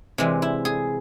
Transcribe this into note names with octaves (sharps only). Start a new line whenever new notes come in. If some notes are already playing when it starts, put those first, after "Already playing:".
C3 E3 G#3
E4
G#4